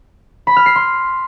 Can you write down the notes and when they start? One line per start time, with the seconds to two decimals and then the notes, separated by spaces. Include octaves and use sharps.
0.47 B5
0.57 F6
0.66 C7
0.76 C6